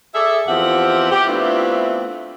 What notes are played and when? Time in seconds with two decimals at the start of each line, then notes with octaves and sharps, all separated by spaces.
0.15 G#4 A4 D5 E5
0.48 E2 F3 C4 G4 E5 F#5
1.12 G4
1.27 A3 B3 C4 D4 E4 F4